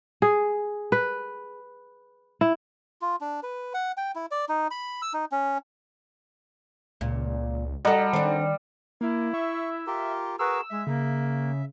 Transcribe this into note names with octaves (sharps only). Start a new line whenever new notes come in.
G#4
B4
E4
F4
D4
B4
F#5
G5
E4
D5
D#4
B5
E6
D#4
C#4
C#2 A#2
G3 F#4 A4 D#5 F#5 A#5
D#3 C4 D4
A#3 E4
E5 C#6
F4 G4 A#4
F#4 G#4 A#4 B4 E6
G#3 E5
C#3 A#3